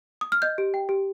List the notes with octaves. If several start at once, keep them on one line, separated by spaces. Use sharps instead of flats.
D#6
F6
D#5 G6
G4
G5
G4